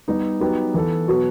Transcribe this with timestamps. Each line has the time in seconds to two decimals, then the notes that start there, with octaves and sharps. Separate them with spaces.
0.08 G3 B3 D#4
0.40 F#3 B3 D#4 G4 B4
0.74 E3 B3 E4 A4
1.08 B2 F#3 B3 F#4